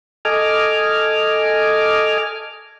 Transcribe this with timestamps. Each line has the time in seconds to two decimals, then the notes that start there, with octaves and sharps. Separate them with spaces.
0.25 A4 D#5 G#5 D6 F6